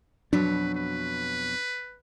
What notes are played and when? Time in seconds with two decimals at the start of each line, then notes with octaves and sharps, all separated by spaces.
0.33 F2 B2 F#3 D4 B4
0.74 B4